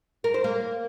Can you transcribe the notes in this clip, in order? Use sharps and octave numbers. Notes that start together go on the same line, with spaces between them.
A#4
C5
A#3